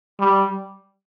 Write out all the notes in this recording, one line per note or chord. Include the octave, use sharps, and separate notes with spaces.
G3